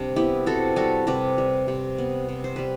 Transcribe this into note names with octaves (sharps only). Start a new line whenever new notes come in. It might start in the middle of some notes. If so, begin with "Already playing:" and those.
Already playing: C3 G3 D4
B3 E4 G4
C3 F#4 A4
G3 F#4 A4
C3 G4 B4
G3
C3
B3
C3
C5
G3 B4